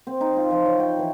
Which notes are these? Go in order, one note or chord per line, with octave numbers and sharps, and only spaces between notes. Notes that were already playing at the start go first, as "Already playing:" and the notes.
C4
D#4
F4
F3
C#5
G5
E3